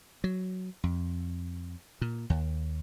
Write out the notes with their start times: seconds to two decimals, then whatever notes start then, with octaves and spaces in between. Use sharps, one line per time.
0.24 F#3
0.84 F2
2.01 A#2
2.30 D#2